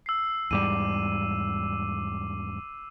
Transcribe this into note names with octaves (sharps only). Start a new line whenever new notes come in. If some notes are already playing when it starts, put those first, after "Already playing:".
E6 C7
E2 G#2 G3 D6 D#7